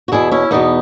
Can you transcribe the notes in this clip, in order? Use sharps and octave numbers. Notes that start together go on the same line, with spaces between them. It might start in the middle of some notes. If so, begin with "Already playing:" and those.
F#4
E2 B2 E4 G#4
C#4 E4
E2 B2 B3 D#4